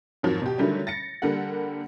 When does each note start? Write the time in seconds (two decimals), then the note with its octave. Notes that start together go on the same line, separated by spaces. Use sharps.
0.23 F2 G#2 D#3 F3 F#3
0.42 B2 G4
0.58 D3 D#3 F#3 G3 A3 C#4
0.87 A6 A#6 C#7
1.22 D3 G3 A#3 A4 F#5